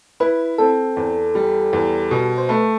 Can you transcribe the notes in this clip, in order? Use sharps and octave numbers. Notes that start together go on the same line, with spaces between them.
E4 B4
C4 A4
E2
G3
E2
B2
C5
A3 B4